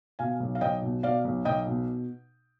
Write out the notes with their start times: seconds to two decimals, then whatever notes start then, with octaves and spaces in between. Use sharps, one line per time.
0.19 B2 F5 G#5
0.40 B1
0.55 F5
0.61 B1 D#5 G5
0.82 B2
1.03 B2 D5 F5
1.24 B1
1.45 B1 D#5 G5
1.67 B2